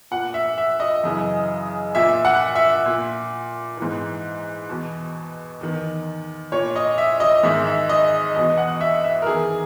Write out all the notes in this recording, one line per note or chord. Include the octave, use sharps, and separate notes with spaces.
A#2 F#5
E5
E5
D#5
F#2 C#3 E3
A#2 E5
F#5
E5
A#2
G#2 E3
E2 B2
E2 D#3
A#2 C#5
D#5
E5
D#5
G#2 D#3 E5
E5
D#5
E2 B2 D#5
F#5
E5
E5
A#4
E2 D#3 G#4